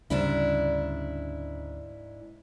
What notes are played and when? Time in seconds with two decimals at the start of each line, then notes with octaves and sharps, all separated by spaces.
0.10 D2 G#2 C#3 G3 D4 E4